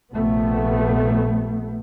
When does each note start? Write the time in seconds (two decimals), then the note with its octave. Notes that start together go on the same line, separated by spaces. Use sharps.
0.14 A#1 C3 A3 B3